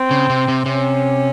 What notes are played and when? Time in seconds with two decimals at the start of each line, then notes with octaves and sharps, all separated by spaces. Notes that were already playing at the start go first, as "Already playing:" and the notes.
Already playing: C4
0.11 C#3
0.30 C3
0.48 C3
0.66 C3 C#4